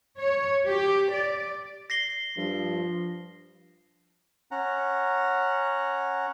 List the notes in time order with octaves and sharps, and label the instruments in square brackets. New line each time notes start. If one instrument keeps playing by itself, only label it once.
[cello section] C#5
G4
D5
[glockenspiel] A#6 C7 G7
[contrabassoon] G2 [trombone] F3
[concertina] C#4 F#5 A#5